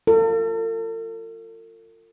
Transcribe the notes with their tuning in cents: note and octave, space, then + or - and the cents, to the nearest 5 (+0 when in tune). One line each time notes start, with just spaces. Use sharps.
F4 +0 A4 +45